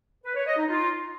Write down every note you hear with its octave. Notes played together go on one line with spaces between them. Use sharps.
B4
C#5
D#5
D#4
F4